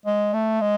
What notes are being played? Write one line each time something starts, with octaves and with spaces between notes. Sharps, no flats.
G#3
A3
G#3